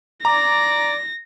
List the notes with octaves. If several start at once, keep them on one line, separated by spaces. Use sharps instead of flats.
D5 A#5 D6 A#6